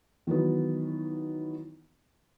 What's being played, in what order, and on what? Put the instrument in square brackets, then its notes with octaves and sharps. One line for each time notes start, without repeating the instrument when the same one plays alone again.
[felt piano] D#3 E3 F#3 B3